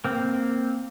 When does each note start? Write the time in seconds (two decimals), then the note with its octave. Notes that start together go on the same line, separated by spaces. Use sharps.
0.04 A#3 C4